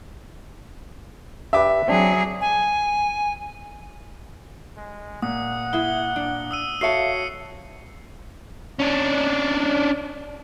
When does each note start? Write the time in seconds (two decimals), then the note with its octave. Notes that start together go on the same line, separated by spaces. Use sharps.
1.53 D4 G4 B4 E5 D6
1.88 F#3 C4 D4 G#4
2.41 G#5
4.77 G#3
5.22 A#2 F#5 D#6
5.73 E4 G#4 E5 G7
6.16 D4
6.51 D#6 E6 D#7
6.81 F#4 A4 C#5 E5 F5 A5 C7 C#7
8.80 C#4 D4